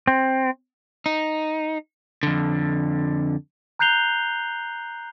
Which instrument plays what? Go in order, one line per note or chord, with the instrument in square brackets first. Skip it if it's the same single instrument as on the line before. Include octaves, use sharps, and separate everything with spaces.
[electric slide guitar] C4
[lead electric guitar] D#4
F2 D3
[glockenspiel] A#5 F#6 G6 C7 F7 G7